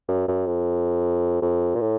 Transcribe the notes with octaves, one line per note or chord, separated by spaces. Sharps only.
F#2
F#2
F2
F2
A#2
A2